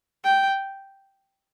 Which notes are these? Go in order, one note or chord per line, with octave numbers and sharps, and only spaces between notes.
G5